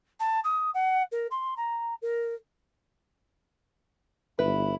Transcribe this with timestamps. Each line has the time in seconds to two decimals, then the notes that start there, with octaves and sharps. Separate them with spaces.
0.20 A5
0.44 D#6
0.74 F#5
1.12 A#4
1.31 C6
1.57 A#5
2.02 A#4
4.39 G1 E4 B4